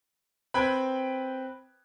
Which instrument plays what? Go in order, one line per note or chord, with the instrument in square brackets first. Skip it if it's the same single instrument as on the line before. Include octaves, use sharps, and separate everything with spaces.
[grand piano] C4 B4 G#6 [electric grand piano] G5 B5